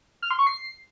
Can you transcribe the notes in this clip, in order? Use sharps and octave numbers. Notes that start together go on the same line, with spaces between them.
F6
C6
C#6
C7